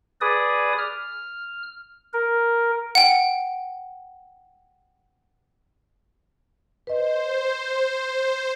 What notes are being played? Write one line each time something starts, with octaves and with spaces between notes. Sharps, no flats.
G#4 B4 D5 D#6
F6
A#4
F#5 G5
B4 C5 D#5